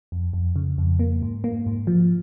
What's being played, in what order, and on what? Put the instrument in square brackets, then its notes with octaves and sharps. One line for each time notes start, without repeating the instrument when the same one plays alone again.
[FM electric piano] F2
F2
C#3
F2
A#3
G#2
A#3
G#2
F3